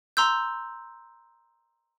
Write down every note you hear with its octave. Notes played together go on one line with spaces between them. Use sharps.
A#5 C6 E6 G6